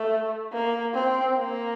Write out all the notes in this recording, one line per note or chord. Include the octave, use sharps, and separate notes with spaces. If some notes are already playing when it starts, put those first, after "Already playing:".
Already playing: A3
A#3
C4
A#3